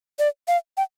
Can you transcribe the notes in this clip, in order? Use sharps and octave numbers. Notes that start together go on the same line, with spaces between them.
D5
F5
G5